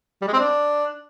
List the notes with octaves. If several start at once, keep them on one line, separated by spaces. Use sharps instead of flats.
G3
G#3
C4
D4